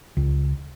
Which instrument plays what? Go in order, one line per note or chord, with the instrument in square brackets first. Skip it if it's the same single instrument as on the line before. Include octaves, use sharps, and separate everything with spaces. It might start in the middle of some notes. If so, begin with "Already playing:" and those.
[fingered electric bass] C#2